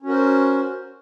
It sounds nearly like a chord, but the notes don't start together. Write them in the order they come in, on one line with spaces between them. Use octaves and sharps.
C#4 F#4 A#4 C5